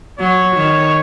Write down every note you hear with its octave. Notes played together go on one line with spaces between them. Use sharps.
F#3 C#5
D#3